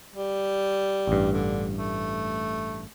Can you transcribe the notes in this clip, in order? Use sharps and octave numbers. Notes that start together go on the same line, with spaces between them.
G3
A1 G2
D3
A3